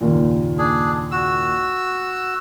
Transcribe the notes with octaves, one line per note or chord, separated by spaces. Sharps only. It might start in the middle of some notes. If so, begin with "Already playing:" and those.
F#1 D#2 A#2
D4 G#4
F#4 E6